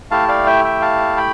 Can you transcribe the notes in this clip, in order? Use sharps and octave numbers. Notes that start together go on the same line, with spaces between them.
A3 E4 G4 F5 A5
D5 F5
E5 G5
E5 G5
F5 A5
G5 B5